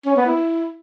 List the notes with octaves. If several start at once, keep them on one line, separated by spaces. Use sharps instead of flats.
C#4
B3
E4